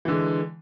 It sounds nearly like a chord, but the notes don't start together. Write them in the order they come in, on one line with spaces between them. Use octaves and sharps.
E3 D3 G#3